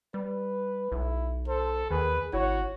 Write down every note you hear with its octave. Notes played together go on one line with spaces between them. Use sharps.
G3 B4
B1 E4
A4 C5
D#2 D#3 G#4 B4
G#1 E4 F#4 C#5